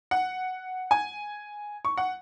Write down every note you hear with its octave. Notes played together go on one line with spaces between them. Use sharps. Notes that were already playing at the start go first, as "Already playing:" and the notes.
F#5
G#5
C#6
F#5